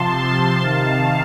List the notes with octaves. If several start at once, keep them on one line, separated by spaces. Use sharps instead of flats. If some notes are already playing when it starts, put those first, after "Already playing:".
Already playing: C3 F3 A5 C6
A5 C6
C3 D#3 F5 A5